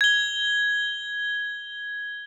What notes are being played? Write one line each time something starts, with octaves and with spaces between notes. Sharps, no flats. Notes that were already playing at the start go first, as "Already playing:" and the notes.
G#6 G7